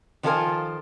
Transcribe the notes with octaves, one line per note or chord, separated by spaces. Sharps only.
D#3 F3 F4 A4 A#4 G#5